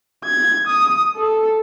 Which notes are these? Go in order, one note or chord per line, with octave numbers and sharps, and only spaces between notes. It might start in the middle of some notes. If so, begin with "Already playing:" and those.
G#6
D#6
A4